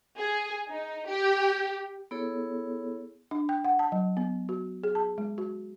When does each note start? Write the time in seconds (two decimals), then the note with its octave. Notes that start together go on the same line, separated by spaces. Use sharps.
0.17 G#4
0.69 D#4
1.07 G4
2.11 B3 E4 G#4 A4 C#5
3.31 D4
3.49 G5
3.65 F#5
3.79 A5
3.92 F#3
4.17 B3
4.49 F#4
4.84 G#4
4.95 A5
5.18 G#3
5.38 F#4